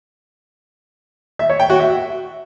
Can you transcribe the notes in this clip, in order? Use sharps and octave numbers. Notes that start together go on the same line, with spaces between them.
E5
C#5
G5
F#4
E5